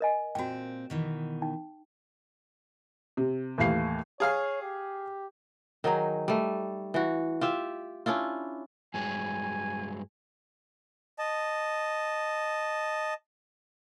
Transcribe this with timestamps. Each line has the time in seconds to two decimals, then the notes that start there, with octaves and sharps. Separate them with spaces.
0.01 A#4 D#5 G#5
0.35 A#2 C4 F#4 G5
0.90 B2 D#3 E3
1.42 D#4 G5
3.17 C3
3.58 D#2 A2 E3 F5 C7
4.20 G#4 C#5 F5 F6
4.62 G4
5.84 D#3 F#3 D#4 G#4
6.28 G3 A3
6.94 E3 F#4
7.41 F4 G4 E5
8.06 C#4 D4 E4 F4
8.94 G2 F#3 G#3 G#5
11.19 D#5 A5